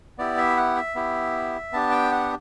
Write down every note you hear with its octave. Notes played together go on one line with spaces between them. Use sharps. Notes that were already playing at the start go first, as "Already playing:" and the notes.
B3 E4 G4 D5
E5
F#5
E5
B3 E4 G4
B3 D4 G4 A5
G5
F#5